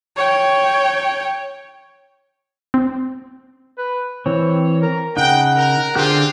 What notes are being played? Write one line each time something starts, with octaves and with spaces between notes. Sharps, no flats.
C#5 G5
C4
B4
E3 C4 C#5
A#4
C#3 D#4 F#5 G5
A#4
D3 C4 F4 G4 G#4 F#6